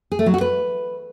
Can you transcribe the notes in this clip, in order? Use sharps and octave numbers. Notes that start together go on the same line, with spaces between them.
G#4
A3
F#3
F#4
B4